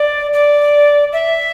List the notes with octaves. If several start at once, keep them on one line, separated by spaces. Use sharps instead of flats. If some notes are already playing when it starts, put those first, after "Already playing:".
Already playing: D5
D5
E5